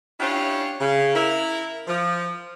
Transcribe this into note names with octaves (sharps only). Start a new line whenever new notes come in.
C#4 D4 E4 F4 G4 C#5
C#3
E4 A#4 E5
F3